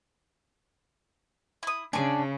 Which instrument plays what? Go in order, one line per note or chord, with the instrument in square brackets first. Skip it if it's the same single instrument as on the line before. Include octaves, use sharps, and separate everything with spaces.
[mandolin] E4 D#6
[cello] C#3 [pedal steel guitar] D4 [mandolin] G#4 D5